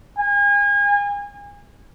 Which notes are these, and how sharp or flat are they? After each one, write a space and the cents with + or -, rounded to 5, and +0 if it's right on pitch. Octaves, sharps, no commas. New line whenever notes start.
G#5 -35